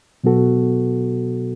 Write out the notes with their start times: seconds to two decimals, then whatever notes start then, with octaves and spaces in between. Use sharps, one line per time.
0.24 B2 F#3 B3 F#4 A4